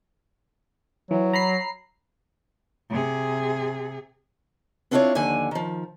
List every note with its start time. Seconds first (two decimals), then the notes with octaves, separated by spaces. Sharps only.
1.11 E3 F#3
1.33 A#5 B5 C7
2.90 C3 G#4
4.91 B3 C4 D4 E4 F4 C#5
5.15 D#2 D3 F3 F#4 G#5
5.51 D#3 F3